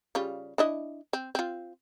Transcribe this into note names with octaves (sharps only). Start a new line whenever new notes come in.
C#3 G3 F4
D4 E4 D#5
C4
C4 F4